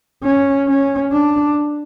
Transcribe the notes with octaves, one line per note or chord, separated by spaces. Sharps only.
C#4
C#4
D4